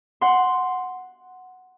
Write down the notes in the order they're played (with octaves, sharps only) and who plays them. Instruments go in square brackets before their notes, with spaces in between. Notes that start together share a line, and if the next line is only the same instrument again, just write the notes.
[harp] F#5 C6